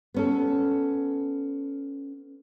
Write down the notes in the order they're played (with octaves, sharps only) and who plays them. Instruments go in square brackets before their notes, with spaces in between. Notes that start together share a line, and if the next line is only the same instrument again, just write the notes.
[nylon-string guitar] B3 C#4 A4